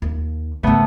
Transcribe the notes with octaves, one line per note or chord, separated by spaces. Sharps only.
D#2
G#2 C#3 A3 B3